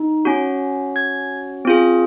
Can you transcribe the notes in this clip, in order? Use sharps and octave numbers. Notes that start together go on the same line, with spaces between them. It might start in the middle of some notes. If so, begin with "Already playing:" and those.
Already playing: D#4
C#4 F#4
G#6
C4 F4 G#4